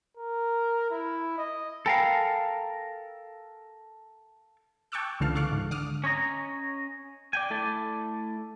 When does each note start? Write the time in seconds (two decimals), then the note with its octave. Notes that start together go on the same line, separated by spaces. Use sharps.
0.17 A#4
0.91 E4
1.38 D#5
1.86 A4 A#4 F5 G5 G#5 B5
4.92 G5 A5 C#6 D6 E6 F#6
5.20 C#2 D3 E3 F5 A5 F6
5.35 A4 F5 C#6 D6 F6 F#6
5.52 G#2
5.71 D3 D6 D#6 F6
6.04 C#4 C#5 D#5 A#5
7.33 D5 G5 G#5
7.50 A3 E4 A4 D5